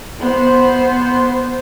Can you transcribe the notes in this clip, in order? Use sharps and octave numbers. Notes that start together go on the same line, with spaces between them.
B3 C5